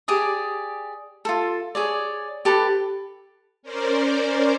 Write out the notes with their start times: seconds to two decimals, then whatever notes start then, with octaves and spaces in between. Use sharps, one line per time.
0.08 G4 G#4 D5 D#6
1.25 F4 A4
1.75 G#4 C#5 D5
2.45 G4 A4 B4
3.63 C#4 A#4 C5 D5